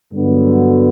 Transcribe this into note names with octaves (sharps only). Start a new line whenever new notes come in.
G2 D3 F#3 B3